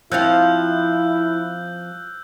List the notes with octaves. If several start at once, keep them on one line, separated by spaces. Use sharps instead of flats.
F3 C4 E4 F4 E6 F#6 G6